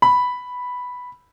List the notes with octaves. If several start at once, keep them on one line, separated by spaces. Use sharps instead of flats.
B5